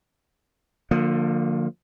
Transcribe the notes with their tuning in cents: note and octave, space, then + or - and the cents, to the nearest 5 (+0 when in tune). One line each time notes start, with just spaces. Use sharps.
D3 +15 F3 +25 A#3 -20